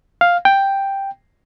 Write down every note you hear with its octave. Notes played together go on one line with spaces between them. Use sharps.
F5
G5